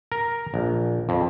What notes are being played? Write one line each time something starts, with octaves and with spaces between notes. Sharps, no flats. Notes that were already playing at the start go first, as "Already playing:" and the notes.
A#4
A#1
F2